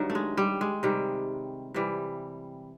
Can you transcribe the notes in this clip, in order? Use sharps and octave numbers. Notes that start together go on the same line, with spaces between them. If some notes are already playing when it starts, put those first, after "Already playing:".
Already playing: G2 D#3 F#3
A3
G#3
G3
G#3
C3 D#3 G3
C3 E3 G3